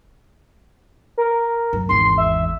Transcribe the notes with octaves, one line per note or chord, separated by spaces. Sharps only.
A#4
F#2
G#1 E2 C6
E5